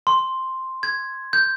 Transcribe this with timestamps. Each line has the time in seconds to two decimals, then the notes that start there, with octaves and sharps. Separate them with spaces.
0.07 C6
0.83 G#6
1.33 G6